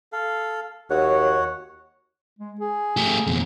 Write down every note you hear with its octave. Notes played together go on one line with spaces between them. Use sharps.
A4 F5
D#2 F#4 C#5 F#5
G#3
G#4
A3 G4
F2 B2